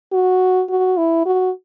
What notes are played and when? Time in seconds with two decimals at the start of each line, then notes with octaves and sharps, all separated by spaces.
0.12 F#4
0.69 F#4
0.97 E4
1.26 F#4